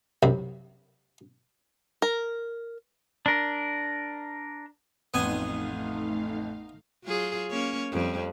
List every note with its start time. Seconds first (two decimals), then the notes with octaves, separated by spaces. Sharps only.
0.23 C2 F#2 C3
2.02 A#4
3.26 D4 A#4
5.14 A1 F2 A3 B3 D#4 F5 G#5
7.04 F#3 F4 G#4
7.50 A#3 C#4 C#5
7.92 F2 G3